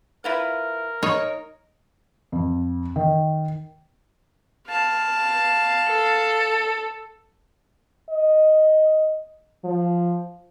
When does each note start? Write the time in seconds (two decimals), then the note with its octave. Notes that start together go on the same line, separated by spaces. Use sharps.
0.24 E4 F4 A#4 B4
1.03 D#4 C#5
2.32 F2
2.96 D#3
4.68 F5 A5
5.89 A4
8.10 D#5
9.64 F3